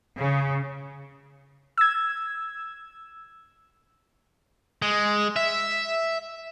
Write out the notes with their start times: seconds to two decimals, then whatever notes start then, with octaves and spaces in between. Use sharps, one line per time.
0.16 C#3
1.78 E6 G#6
4.82 G#3
5.36 E5